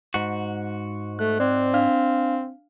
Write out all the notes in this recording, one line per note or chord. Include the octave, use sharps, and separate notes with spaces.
G#2 F#4
A3 F#6
C4 D5
D4 F5 F6